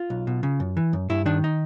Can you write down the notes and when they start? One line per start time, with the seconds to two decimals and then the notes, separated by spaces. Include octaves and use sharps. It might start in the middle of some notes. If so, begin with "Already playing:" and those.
Already playing: F4
0.10 B1
0.27 B2
0.43 C#3
0.60 F#2
0.77 E3
0.93 F#2
1.09 G2 E4
1.26 D#3 D4
1.44 D#4